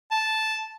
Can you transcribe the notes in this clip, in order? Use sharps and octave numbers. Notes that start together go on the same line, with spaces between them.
A5